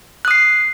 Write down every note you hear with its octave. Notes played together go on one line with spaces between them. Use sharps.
D#6 F#6 C7